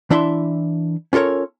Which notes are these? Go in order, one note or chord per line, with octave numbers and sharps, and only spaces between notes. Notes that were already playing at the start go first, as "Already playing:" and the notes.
E3 D4 E4 E5 C6
C#4 F4 A4 A#4 C#5